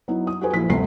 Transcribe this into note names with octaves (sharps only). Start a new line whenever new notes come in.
F#3 B3 D#4 E4
D#6
F#4 G4 A4 B4 C5 G#5
A#1 F3 E4 F4 B6
G1 D2 C3 C5 C7